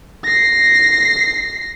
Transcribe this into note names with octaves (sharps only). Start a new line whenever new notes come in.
A#6 C7